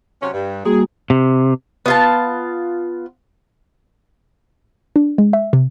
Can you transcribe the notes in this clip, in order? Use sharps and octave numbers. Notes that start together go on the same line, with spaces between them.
C3 F#3 C#4
G2
G3 A#3 F#4 G#4
C3
B3 F4 A5
D4
G#3
E5
C3